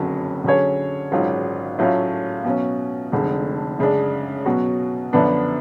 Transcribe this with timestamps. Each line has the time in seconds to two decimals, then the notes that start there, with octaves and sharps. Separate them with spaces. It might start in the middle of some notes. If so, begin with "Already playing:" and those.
Already playing: F#1 F2 D3 F#3 C#4
0.44 D3 F#3 C#4 G#4 C#5
1.12 G#1 G#2 F#3 C#4 F4
1.78 A2 F#3 A3 C#4 F4
2.44 B2 F#3 C#4
3.12 F1 F2 D3 G#3
3.79 F#2 C#3 G#3 D4
4.45 B2 F#3 C#4 F#4
5.13 F#2 D3 F3 B3 D4